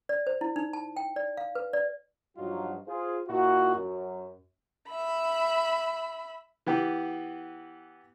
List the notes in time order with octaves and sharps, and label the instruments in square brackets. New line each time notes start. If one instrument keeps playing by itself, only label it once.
[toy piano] D5
C5
E4
D#4
A5
G5
D5
F5
B4
D5
[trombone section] G2 F3 F#3 D#4 F4 F#4
F4 G#4 C5
A#2 D#4 E4 F#4
F#2
[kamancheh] E5 B5
[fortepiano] E3 B3 G4